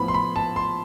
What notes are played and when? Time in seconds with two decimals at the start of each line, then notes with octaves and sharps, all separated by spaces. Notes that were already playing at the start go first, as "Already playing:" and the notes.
Already playing: A2 F3 B3 B5
0.08 C6
0.14 B5
0.36 A5
0.56 C6